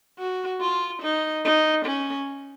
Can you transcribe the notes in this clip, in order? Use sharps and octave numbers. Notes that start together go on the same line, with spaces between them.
F#4
F4
D#4
D#4
C#4